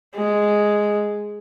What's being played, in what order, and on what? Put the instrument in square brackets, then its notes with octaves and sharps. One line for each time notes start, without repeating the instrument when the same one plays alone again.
[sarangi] G#3